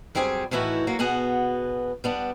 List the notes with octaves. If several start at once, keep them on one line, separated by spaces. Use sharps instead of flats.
F#2 G3 C4 G#4 G#5
A2 D#3 E3 E4 F#4
F#3 A#3 F#4
B2 B3 F#4 G#4 F#5
G3 B3 D4